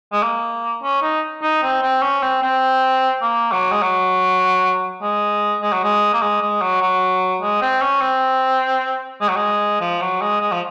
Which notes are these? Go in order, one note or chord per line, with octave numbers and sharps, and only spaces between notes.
G#3
A#3
C#4
D#4
D#4
C4
C4
C#4
C4
C4
A#3
F#3
G#3
F#3
G#3
G#3
F#3
G#3
A#3
G#3
G#3
F#3
F#3
G#3
C4
C#4
C4
G#3
F#3
G#3
F3
F#3
G#3
G#3
F3